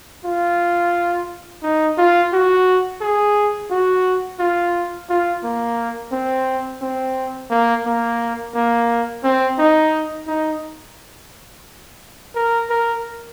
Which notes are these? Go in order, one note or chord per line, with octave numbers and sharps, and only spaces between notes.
F4
D#4
F4
F#4
G#4
F#4
F4
F4
A#3
C4
C4
A#3
A#3
A#3
C4
D#4
D#4
A#4
A#4